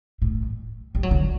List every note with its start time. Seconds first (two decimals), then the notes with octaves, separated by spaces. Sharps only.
0.22 A2
0.95 G3
1.03 F#3
1.11 D3